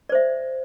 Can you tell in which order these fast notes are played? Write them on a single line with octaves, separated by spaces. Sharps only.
D5 C5 E5